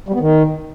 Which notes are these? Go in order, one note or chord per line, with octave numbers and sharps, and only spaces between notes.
G3
B3
D#3